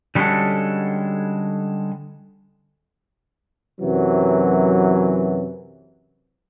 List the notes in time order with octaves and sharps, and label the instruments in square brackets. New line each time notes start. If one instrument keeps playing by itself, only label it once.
[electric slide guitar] D3 G3 G#3 C#4 F#4 A4
[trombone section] F#2 C3 E3 F#3